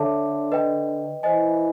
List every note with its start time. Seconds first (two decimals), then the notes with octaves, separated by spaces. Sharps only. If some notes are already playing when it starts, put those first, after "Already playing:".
Already playing: D3 A4 C#5 E5 A5 D6
0.52 B4 D#5 G5
1.23 E3 C5 D#5 G#5